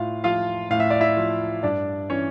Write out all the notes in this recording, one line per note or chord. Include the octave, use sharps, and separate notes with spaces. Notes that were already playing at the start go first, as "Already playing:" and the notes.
Already playing: A2 F4 F5
F3 F4 F5
A2 F5
E5
D5
E4 E5
F3
G2 D4 D5
E3 C#4 C#5